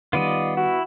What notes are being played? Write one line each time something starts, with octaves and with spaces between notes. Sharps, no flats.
D#3 G3 B3 F4 D5 D#5
E4 F#4